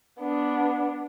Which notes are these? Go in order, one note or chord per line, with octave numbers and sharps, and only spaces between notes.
B3 D4